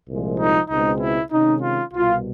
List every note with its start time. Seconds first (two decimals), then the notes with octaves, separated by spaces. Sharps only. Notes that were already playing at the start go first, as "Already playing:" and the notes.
0.10 C2 A#2 F3 G#3
0.40 D#4
0.70 C#2 B2 G#3 C4 D#4
1.01 E4
1.32 C3 D#3 G#3 C#4 D#4
1.62 F4
1.94 C2 B2 G3 F4